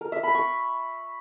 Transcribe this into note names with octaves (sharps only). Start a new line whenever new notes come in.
A#4
E5
B5
C#6